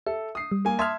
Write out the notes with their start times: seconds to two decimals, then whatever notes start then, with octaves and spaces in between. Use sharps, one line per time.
0.06 A4 E5
0.35 D#6 C7
0.52 G3
0.65 A#3 G#5
0.79 E5 A5 C6 D#6 F6 G#6